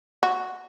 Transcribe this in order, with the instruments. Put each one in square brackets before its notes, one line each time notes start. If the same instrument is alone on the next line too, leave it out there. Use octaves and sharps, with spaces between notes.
[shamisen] F#4